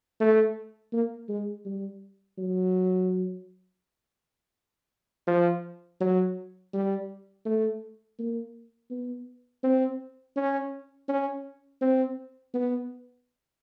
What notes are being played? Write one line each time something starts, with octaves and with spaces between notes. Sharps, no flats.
A3
A#3
G#3
G3
F#3
F3
F#3
G3
A3
A#3
B3
C4
C#4
C#4
C4
B3